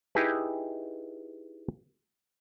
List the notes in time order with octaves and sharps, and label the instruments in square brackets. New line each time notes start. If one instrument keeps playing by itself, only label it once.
[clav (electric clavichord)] D#4 E4 G4 G#4 B4